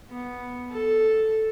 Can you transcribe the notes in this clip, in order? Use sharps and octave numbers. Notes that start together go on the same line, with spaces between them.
B3
A4